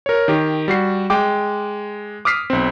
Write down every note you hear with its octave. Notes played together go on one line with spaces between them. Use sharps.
A#4 C#5
D#3 G4
G3 F#4 C7
G#3 G5 D6
D6 D#6 F6 B6 C7
B1 C4